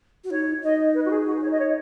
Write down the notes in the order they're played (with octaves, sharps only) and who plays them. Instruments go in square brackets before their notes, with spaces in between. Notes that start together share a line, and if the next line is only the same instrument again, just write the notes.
[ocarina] F#4
[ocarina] D#4 [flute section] C#5
[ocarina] D#4 [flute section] D#5
[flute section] B4
F#4
G#4
F#4
C#5
D#5
C#5